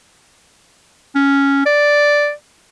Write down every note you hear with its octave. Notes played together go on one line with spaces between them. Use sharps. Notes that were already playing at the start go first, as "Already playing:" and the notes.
C#4
D5